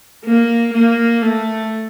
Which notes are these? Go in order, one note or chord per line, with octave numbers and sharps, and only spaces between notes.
A#3
A#3
A3